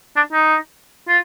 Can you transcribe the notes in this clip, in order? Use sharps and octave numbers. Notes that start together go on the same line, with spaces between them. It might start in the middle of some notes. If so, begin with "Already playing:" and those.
D4
D#4
F4